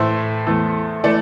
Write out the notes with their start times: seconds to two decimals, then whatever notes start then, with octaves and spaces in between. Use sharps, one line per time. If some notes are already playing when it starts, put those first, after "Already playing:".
Already playing: A2 E3 A3 C5 E5
0.47 E2 E3 A3
1.04 E3 A3 A4 D5